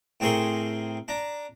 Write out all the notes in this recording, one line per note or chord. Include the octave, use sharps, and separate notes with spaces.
A2 C4 G#4 A#4 C6 C#6
D4 A#5